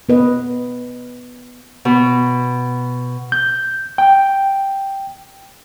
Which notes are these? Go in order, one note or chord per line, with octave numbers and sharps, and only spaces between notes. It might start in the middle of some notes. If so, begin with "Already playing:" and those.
B3 B4 D#5
B2
G6
G5